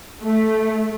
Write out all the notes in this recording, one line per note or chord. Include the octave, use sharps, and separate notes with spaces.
A3